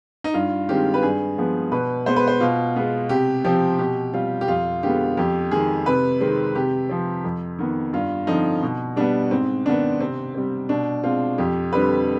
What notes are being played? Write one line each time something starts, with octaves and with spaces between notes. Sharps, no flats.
D#4
G2 F4
D#3 G#3 C4 G4
B4
G2 G#4
F3 G#3 B3
B2 B4
G#3 B3 C5
B4
C5
B2 F4
G#3 B3
C3 G4
F3 C4 G4
B2 G4
G3 C4 F4
G4
F2 F4
D3 G#3 B3 G4
F2 G4
D#3 G#3 G#4
C3 B4
D#3 G#3 C4
C3 G4
F3 C4
F2
D#3 B3
G2 F4
D3 F3 C4 D#4
B2
G3 B3 D4
G#2 C4
D#3 B3 D4
C3 C4
G3 C4
B2 D4
G#3 C4 F4
F2 G4
D3 G3 C4 B4